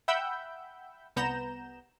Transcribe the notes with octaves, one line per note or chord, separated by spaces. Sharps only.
E5 F#5 G5 B5 E6 G6
C2 B3 A#5 G6 E7